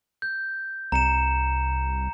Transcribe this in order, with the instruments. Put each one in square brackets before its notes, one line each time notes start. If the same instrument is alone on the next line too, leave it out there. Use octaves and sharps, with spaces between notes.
[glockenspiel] G6
[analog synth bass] C2 [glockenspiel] A#5 C#7 E7